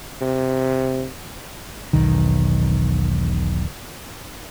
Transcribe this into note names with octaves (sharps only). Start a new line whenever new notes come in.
C3
E1 B1 D#3